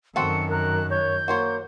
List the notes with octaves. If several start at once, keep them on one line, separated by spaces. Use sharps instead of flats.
F#2 D#3 C4 F#4 A4 C#7
A#4 F#6
C#5 G6
A#3 F#4 C5 C#5